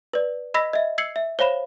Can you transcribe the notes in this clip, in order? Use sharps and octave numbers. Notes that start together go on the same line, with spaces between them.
B4 D5
D#5 B5 E6 A#6 B6
D#5 E5
E6 G#6 C7 C#7 F#7
E5
C5 C#5 F5 B5 E7